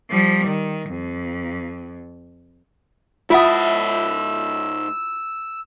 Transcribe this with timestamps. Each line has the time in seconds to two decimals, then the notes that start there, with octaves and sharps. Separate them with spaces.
0.10 F3 G3
0.47 D#3
0.90 F2
3.30 G#2 E4 F4 E5 F#5 A5 D#6 E6